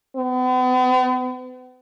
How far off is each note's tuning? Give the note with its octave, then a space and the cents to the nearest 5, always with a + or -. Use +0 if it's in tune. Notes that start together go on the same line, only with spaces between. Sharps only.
B3 +45